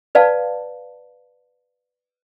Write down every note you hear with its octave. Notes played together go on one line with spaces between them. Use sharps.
B4 D5 F5 A5